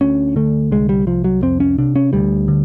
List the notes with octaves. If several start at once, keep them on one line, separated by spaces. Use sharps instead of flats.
D2 C#4
D3 A3
C2 G#3
G3
C2 F3
F#3
F2 C4
C#4
C3 D4
C#4
D2 G3
D3